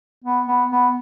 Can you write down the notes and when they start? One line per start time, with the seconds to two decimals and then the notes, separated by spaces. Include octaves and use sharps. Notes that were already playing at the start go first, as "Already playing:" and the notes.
0.24 B3
0.47 B3
0.71 B3